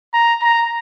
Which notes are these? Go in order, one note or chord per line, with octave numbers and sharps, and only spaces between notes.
A#5
A#5